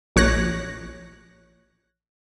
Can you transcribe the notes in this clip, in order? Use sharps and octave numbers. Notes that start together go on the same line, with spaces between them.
A#1 C#5 F#6 A#6